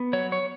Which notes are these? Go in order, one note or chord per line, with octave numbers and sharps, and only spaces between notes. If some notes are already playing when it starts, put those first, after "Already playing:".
Already playing: B3
F#3 C#5
C#5